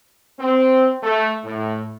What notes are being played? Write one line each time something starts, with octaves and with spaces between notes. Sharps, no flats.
C4
A3
A2